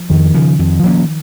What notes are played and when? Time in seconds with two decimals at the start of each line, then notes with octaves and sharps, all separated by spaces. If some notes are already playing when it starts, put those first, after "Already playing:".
Already playing: F3
0.10 F2 D#3
0.34 C#3 F3
0.59 F2
0.84 F3 A#3 C#4